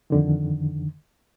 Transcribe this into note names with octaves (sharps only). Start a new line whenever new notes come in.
F2 D3 D#3